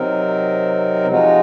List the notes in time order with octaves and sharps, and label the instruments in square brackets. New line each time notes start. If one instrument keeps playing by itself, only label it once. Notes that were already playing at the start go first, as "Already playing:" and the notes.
Already playing: [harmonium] C3 F#3 C4 D#4 A#4
C3 F3 G#3 D#4 F#4